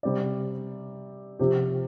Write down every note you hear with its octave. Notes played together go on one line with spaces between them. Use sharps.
C3 G3 C4 G4 D5
C3 F3 C4 G4